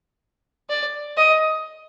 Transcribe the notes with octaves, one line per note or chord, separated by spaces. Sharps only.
D5
D#5